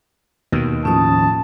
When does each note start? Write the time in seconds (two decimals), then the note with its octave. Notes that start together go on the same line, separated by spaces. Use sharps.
0.52 D#2 B2 D#3
0.85 A2 F3 C#4 A5 D#6